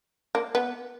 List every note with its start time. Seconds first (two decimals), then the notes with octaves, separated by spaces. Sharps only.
0.35 A#3
0.55 B3